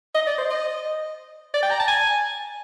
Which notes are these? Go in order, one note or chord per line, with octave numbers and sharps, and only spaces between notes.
D#5
D5
C5
D#5
D5
G5
A#5
A5
G#5